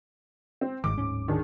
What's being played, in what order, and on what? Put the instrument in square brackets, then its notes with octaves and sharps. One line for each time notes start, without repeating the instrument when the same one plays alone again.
[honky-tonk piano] C4
[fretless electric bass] G1 G#2 D#3 [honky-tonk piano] D6
[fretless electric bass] D1 G#2 C#4
[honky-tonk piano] D#3 D4 G#4